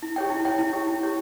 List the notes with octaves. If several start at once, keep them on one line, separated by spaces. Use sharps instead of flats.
E4
G4 C#5 G5
E4
G4 C#5 G5
E4
G4 C#5 G5
E4
G4 C#5 G5